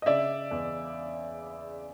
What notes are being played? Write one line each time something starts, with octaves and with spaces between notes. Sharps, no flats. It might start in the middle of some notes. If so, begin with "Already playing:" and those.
D#5
C#3 D5 E5
E2